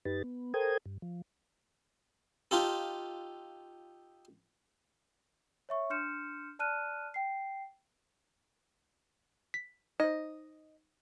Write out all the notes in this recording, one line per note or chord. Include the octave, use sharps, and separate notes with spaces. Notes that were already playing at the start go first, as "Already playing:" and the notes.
F#2 D#4 G4 B4 A6
B3
A4 A#4 C5 G5 D#6 G#6
G2
F3
D#4 F4 G4 A4
C#5 E5 C#6
D4 C6 F6 G6 C#7 E7
D5 A5 F6 F#6 D#7
G5 C7
B6
D#4 C5 D#5